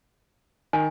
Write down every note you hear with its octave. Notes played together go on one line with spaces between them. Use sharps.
D#3 G#5